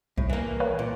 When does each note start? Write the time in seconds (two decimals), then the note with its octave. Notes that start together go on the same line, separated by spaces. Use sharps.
0.17 C2 A2
0.30 E3 A#3
0.60 B4 C#5 F5
0.79 A#2